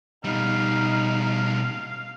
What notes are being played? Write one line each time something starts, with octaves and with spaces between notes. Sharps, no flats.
B2 G3 D#4 F5